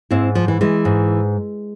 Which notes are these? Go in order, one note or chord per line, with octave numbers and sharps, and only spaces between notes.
G#2 C4 E4
F3
E3
E3 G#3
G#2